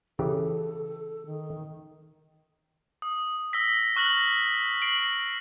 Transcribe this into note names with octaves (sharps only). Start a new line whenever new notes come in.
C#3 E3 G4 A4
D#3
D#6
E6 A#6 B6
C#6 F6 F#6 A#6 F#7
A#6 C7 D7 F#7